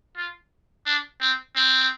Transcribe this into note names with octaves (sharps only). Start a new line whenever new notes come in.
F4
D4
C4
C4